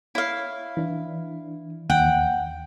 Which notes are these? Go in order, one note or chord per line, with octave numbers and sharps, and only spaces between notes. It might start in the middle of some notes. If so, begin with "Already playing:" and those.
E4 C#5 F5
E3 D4
D#2 F#5 G5